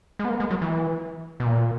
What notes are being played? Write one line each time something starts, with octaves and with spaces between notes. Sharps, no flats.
G#3
B3
A#3
G#3
F#3
E3
B2
A#2